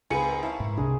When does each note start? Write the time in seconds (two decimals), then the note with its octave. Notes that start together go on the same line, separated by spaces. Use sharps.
0.10 C#2 C4 D#4 G#4 B4 G#5 C#7
0.28 A#4 D#5
0.43 C#4 E4 F5 A5
0.60 G#2
0.77 C2 C3 D4 G#4